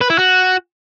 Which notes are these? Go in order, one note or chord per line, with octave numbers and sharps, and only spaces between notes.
B4
E4
F#4